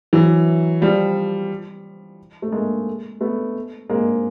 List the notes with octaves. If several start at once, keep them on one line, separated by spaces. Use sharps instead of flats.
E3 F#3
F3 G3
A3
G#3 A#3
A3 B3
G#3 A#3